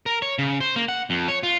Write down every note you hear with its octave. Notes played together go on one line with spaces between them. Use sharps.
A#4
C#5
C#3
C5
A#3
F#5
F2
C#5
F4